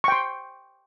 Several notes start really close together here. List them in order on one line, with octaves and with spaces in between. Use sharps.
C#6 G5 C6